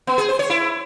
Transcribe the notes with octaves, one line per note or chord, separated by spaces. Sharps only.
B3
G#4
C5
C#5
E4